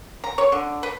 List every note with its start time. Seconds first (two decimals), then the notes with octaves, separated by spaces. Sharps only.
0.24 A#5
0.38 C#5
0.52 D3
0.83 B4